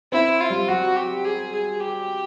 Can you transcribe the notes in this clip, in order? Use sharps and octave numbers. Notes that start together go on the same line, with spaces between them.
C4 E4
F4
G3
F#3 F#4
G4
G#4
G#4
G4